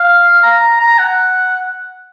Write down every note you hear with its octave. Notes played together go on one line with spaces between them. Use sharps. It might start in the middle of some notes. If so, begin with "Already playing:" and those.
Already playing: F5
A#5
A#5
F#5